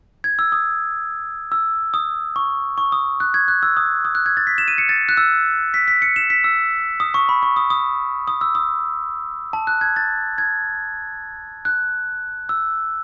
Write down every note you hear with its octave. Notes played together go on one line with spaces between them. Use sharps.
G#6
E6
D#6
E6
D#6
C#6
C#6
D#6
F#6
G#6
F#6
E6
D#6
D#6
F#6
G#6
A6
B6
E7
D#7
C#7
A6
F#6
E6
B6
B6
C#7
E7
B6
E6
D#6
C#6
B5
C#6
D#6
D#6
D#6
E6
D#6
A5
F#6
G#6
A6
G#6
F#6
E6